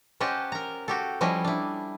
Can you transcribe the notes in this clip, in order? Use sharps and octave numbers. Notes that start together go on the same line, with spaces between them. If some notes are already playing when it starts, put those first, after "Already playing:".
C#4 G4 C5 D#5 F#5 A5
A#4 A#5
F#4 G4 A4
F3 G3 C#4 E4 D#5
D4 E4